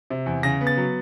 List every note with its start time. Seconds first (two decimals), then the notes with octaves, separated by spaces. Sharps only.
0.10 C3
0.26 E2
0.43 C#3 A#6
0.61 B3
0.67 A6
0.77 F#3